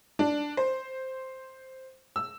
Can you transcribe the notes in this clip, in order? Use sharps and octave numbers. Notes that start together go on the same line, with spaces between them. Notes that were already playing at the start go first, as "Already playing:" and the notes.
D4
C5
E6